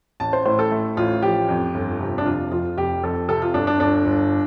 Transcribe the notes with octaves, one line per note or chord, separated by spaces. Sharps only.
A1 A5
C5
A2 C5
A4
A3
A1 F4
F3 G4
F2
G1
C3
D4
F1 F4
F2 F4
F1 G4
F2 A4
C3 A4
F4
G1 D4
D4
G1 D4
G1